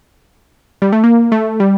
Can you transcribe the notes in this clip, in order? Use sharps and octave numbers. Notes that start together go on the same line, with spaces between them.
G3
A3
A#3
A3
G3